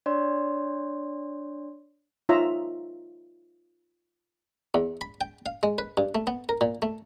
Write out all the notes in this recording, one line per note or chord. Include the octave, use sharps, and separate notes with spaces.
D4 C#5 D5 C6
D#4 F4 C#5 E5 A#5
E2
B5
G5
F5
G#3
B4
G2
A3
B3
A#4
A#2
A3